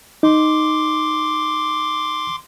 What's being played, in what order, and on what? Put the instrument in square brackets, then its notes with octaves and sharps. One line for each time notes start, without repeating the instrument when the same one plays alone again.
[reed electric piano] D#4 [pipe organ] C6 D6